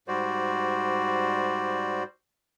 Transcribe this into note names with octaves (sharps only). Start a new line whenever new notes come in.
G#2 G3 F#4 C5 D5